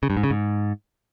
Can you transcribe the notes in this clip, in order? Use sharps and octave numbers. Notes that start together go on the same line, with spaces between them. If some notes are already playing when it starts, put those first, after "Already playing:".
C#3
G2
G#2
C#3
G#2